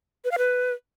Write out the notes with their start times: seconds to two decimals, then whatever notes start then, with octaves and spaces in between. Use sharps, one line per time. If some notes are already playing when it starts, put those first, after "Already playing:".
0.25 B4
0.31 F5
0.38 B4